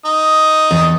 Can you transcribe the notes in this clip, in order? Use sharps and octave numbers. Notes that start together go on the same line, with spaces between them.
D#4
E2